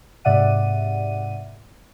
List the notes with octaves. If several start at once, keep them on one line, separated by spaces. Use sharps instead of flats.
G#2 C3 D5 E5 F#5 D#7